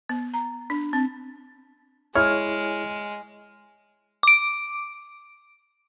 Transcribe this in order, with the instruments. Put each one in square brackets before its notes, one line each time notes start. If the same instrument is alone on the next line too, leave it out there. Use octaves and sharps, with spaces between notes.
[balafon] B3
A#5
D4
C4
[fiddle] G#3 [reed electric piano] E4 G#4 C#5 [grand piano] F6
[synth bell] D6 D7